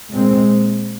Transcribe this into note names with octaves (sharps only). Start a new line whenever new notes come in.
A#2 G#3 C4